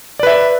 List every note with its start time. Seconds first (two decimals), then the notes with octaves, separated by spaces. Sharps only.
0.19 D5
0.23 B4
0.27 E5